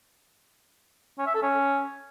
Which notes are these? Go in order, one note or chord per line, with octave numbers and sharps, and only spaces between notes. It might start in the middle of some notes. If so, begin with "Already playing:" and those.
C#4
E5
A4
C#4